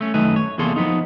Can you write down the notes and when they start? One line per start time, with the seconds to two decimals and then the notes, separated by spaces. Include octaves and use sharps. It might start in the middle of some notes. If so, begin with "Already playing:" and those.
0.01 A3 C#4
0.14 F#2 D#3 A3 D#4 B4 G#5
0.36 C#5
0.58 E2 C3 A#3 G#4 A4 C6
0.76 F3 B3 D#4